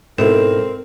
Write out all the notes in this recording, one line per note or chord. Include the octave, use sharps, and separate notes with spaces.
G#2 B2 C4 E4 A4 A#4 E7